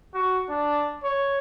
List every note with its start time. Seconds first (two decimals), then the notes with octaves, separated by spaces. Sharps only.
0.14 F#4
0.49 D4
1.03 C#5